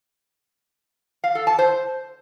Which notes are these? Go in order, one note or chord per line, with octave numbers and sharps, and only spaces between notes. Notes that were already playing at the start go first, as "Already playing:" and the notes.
F5
A4
A5
C5